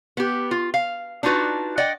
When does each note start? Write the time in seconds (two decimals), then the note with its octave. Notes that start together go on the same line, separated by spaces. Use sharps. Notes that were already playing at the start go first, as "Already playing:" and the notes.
0.17 B3 G4
0.51 F4
0.74 F5
1.23 D4 D#4 F4 F#4 B4
1.78 D5 D#5 F#5 G5